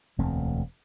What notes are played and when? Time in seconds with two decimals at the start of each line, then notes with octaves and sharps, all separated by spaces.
0.19 E1 D2 A3 C4